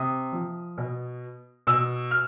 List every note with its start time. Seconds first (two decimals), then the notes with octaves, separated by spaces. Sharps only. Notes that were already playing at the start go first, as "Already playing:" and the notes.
Already playing: C3 D#6
0.33 F3
0.78 B2
1.67 B2 E6
2.11 F6